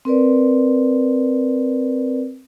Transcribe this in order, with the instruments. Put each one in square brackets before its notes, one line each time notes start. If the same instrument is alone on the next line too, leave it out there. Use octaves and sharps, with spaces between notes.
[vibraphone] C4 A#4 B4 D5